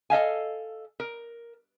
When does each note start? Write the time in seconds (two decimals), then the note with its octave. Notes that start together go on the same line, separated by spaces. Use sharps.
0.10 A4 D#5 F5 G#5
1.00 A#4